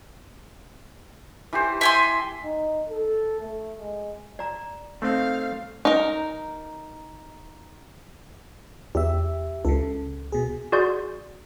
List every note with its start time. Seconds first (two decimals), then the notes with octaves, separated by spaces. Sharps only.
1.53 E3 G4 C5
1.81 E5 G#5 C6
2.44 D#4
2.89 A4
3.40 A3
3.79 G#3
4.39 D5 A#5
5.02 A3 C4 D#4 F5
5.85 D#4 A#4
8.95 E2 G4 E5
9.65 C#2 C#3 A4
10.32 B2 G#4
10.72 F#4 G#4 D5 C6 G6